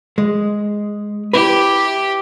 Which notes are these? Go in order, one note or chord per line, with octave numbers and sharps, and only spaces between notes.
G#3
E4 G4 B4